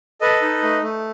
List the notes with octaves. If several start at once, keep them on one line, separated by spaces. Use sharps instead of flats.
A4 B4 D#5
D#4
A3
A3